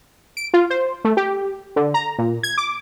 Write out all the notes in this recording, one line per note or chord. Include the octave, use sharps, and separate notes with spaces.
D7
F4
C5
A3
G4
D3
A#5
A#2
G#6
D6